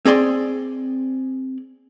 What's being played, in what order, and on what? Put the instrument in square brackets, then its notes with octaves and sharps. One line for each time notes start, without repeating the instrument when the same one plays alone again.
[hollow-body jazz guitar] C4 G#4 D5 C6